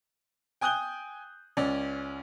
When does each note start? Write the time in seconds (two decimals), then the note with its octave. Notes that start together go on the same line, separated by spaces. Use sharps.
0.61 G5 G#5 D#6 F#6 G6 G7
1.57 C#2 C#4 D5